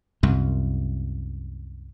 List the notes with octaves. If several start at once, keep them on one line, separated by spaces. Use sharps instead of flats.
C2 F#2